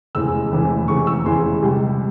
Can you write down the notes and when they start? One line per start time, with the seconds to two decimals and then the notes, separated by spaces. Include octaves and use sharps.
0.15 F1 E2 C#3 E3 G#3 E6
0.52 F1 E2 C#3 E3 G#3
0.88 F1 E2 C#3 E3 G#3 C#6
1.07 E6
1.25 F1 E2 C#3 E3 G#3 C6
1.62 C#2 C3 G3